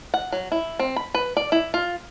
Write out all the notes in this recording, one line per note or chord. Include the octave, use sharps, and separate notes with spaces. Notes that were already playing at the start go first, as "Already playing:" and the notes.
F#5
F#3
E4
C4
B5
B4
D5
E4
F4